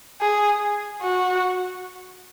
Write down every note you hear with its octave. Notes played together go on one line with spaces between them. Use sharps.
G#4
F#4